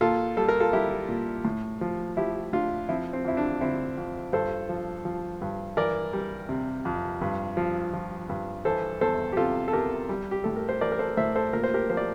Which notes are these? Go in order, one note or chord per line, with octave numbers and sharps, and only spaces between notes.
A#2 F4 A4
G3 A4
A#4
F4 A4
G3 E4 G4
A#2
A2
F3
F3 E4 G4
A2 D4 F4
F3 C4 E4
C4
F2 E4
D4
D3 C4 E4
F2
G2 A4 C5
F3
F3
G2
E3 A#4 D5
G3
C3
F2
G2
F3
F3
G2
E3 A4 C5
E2 A4 C5
G4
C3 F4 A4
A4
E2 G4 A#4
G3
G4
A2 A4
A#4
C5
E3 A#4 D5
A#4
A4 C5
A2 C5 E5
A4 C5
A#2 A#4
C5
G4 A#4
F3 C5
D5